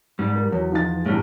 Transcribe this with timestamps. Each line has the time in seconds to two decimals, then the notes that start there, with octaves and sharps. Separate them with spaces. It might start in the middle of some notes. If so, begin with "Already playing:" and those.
0.19 G#2 G3
0.36 A#4
0.52 E2 F#3
0.72 F3 D#4 A6
1.06 G1 E2 A2 G3